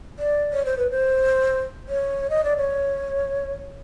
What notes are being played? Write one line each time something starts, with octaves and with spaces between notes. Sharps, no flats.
D5
C#5
C5
B4
C5
C#5
D#5
D5
C#5